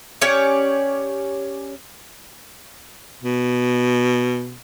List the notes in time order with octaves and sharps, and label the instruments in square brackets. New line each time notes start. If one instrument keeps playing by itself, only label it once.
[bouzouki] C#4 G4 C#5 D5
[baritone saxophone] B2